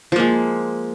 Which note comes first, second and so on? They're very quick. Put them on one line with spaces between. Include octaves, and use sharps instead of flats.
F3 A#3 G#3